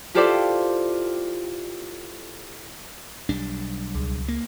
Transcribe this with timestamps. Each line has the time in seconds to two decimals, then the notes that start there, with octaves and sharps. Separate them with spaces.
0.15 E4 F4 G4 A4 C5 D5
3.29 B1 G3 D4
3.95 C#2
4.28 A#3